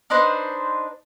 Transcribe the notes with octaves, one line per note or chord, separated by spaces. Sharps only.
D4 D#4 B4 C5